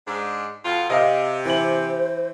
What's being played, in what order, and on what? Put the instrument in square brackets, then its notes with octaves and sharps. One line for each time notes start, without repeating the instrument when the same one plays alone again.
[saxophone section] G#2 D4
F2 B2 F4
[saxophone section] C3 [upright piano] D#5 F5
[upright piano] E3 F#7 [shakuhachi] C5